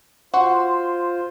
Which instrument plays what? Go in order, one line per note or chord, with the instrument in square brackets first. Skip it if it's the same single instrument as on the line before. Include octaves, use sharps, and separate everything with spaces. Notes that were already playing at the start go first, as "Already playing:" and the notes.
[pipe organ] F4 C5 [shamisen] F#4 [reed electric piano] C6